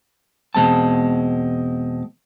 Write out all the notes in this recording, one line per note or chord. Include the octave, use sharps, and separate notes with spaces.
E2 B2 G#3 C4 A5